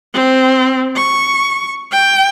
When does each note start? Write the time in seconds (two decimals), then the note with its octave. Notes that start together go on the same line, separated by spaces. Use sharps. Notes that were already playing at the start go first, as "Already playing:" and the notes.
0.14 C4
0.96 C#6
1.92 G5